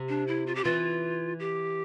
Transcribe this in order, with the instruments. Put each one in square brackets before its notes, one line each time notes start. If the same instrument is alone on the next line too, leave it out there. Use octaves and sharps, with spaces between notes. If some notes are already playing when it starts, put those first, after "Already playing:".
Already playing: [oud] C3
[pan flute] D4
E4
F4
G4
[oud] E3 [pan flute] F4
[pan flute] G4